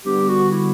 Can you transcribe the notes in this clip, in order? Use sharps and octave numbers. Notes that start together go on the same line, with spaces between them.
D3 G3 B3 G4
F#4
E4